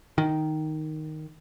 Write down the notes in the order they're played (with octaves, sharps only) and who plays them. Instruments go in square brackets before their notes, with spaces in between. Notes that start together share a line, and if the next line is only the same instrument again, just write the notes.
[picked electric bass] D#3